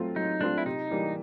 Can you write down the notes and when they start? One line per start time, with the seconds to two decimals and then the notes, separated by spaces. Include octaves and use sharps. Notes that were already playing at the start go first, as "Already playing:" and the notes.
Already playing: F#3 A3 C4 F4
0.16 F#3 D#4
0.41 A3 C4 D4 F4
0.58 E4
0.66 C3 D#4
0.91 E3 G3 A#3 D4